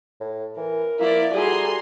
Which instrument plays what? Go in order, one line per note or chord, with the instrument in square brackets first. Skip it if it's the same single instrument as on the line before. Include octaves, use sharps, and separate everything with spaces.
[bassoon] A2
[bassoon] E3 [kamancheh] A#4
[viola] F3 D5 [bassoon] A#3 [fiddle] E4
[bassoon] G3 [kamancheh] F#4 A#5 [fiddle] G#4 [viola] A4 C6